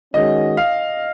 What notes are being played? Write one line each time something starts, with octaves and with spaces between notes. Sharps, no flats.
D#3 G#3 C#4 F#4 D#5
F5